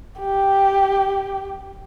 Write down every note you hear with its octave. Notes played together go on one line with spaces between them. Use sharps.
G4